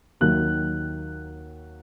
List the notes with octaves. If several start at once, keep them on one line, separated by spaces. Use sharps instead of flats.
D#2 D#3 F#3 F#6